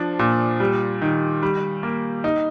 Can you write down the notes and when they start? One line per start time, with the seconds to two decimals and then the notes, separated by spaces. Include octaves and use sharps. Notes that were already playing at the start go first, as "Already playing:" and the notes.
Already playing: F3 D4
0.19 A#2
0.60 G3
1.02 D#3
1.43 G3
1.83 A#3
2.24 D#4